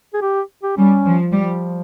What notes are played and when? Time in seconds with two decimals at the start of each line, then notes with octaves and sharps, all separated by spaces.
0.14 G#4
0.22 G4
0.63 G4
0.77 G3 C#4
1.06 F3
1.33 F3 G3